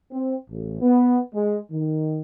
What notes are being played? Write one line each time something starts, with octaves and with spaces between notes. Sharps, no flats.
C4
A1
B3
G#3
D#3